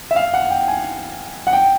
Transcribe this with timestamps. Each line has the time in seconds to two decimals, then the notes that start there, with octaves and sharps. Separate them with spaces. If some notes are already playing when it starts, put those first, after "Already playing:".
0.11 E5
0.16 F5
0.34 F#5
0.50 G5
0.68 G#5
1.47 F#5
1.53 G5